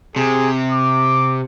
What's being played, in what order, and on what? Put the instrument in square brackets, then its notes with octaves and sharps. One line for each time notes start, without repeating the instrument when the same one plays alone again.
[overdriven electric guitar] C3 [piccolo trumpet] G#4
[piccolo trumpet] D6